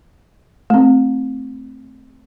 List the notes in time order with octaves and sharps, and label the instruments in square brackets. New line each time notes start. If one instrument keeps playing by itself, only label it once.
[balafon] A3 C4